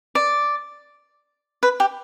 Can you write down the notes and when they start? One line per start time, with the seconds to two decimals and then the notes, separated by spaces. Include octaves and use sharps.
0.15 D5
1.63 B4
1.80 G4